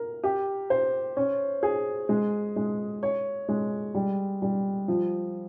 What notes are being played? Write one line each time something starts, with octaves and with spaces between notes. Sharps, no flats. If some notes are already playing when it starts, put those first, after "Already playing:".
Already playing: A#4
G4
C5
C#4
G#4
G#3
G#3
C#5
G#3
G3
G3
F3